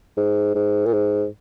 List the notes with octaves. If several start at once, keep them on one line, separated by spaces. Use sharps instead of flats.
G#2
G#2
A#2
G#2